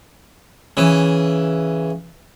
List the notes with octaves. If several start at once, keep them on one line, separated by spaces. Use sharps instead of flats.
C#3 E3